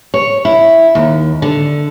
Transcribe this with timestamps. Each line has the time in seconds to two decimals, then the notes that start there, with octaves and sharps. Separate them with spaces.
0.14 C#5
0.45 E4
0.95 D#2
1.42 D3